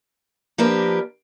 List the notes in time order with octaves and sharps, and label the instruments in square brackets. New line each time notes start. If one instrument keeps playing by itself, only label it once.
[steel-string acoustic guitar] F3 A#3 D4 G4 A#4 B4